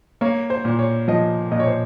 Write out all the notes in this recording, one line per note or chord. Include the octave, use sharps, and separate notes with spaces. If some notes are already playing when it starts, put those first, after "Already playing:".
A#3 C#5
C5
A#2
C#5
F3 D#5
A#2 D#5
C#5
C5